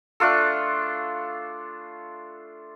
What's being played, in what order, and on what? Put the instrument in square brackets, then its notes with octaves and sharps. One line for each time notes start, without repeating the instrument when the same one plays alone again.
[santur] A3 D4 F4 A4